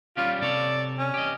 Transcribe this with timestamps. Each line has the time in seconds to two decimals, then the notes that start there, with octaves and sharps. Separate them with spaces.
0.17 G3 C#4 F4 G4
0.42 C3 A4 C#5 D5
0.98 C#4
1.14 G4 D#5